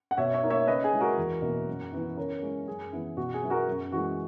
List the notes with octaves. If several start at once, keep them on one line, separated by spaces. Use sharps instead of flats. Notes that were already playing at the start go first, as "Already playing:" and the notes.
F#5
B2 C#5 E5
C#5 E5
A#3 D#4
C#5 E5
C#3 B4 D#5
G#4
G#3 C#4 E4
F#4 A#4
E2
B2 A#3 E4
F#2
E3 B3 E4
C#3 A#4 C#5
G#3 C#4 E4
F#2 G#4
E3 B3 E4
B2 F#4
G#4
F#3 B3 E4
F#4 A#4
F#2
E3 G#3 F#4